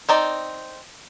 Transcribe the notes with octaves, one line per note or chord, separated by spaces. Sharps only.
C4 D#4 D5